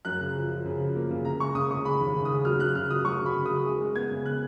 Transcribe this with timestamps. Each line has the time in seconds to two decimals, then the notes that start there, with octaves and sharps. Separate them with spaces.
0.05 F#2 F#6
0.20 C#3
0.35 F3
0.50 F3
0.65 C#3
0.80 F3
0.95 A#3
1.11 C#3
1.25 C#3 A#5
1.40 G#3 C#6
1.55 C#3 D#6
1.71 C#3 C#6
1.85 G#3 B5
2.00 D#2
2.15 C#3
2.25 D#6
2.30 C#3
2.45 F#3 F6
2.60 F#3 F#6
2.75 C#3 F6
2.90 F#3 D#6
3.05 F#3 C#6
3.20 C#3
3.26 B5
3.35 C#3
3.46 D#6
3.50 F#3
3.65 G#3
3.81 G#3
3.96 B3 G#6
4.11 C#3
4.25 F#6